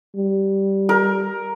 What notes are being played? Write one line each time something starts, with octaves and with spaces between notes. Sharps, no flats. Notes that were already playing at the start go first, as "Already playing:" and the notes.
G3
A#4